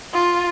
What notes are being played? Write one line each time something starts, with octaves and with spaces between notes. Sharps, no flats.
F4